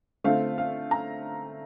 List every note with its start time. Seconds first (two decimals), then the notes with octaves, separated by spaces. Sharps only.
0.24 D3 A3 C4 F4 F5
0.58 F5
0.91 A#5